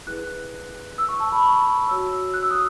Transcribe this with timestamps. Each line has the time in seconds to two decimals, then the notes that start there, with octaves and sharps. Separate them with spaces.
0.07 E4 G#4 B4 F#6
0.98 E6
1.09 C#6
1.20 A5
1.32 B5
1.43 C#6
1.88 F#4 C#5 E6
2.34 F#6
2.43 E6
2.51 D#6